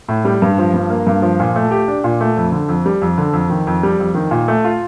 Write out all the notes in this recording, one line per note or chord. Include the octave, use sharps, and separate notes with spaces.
A2
G3
G2
F3
G2
A#3
G2
F3
A#2
A3
G4
D4
A#2
A3
F2
D3
F2
G3
F2
D3
F2
D#3
F2
G3
F2
D#3
A#2
A3
F4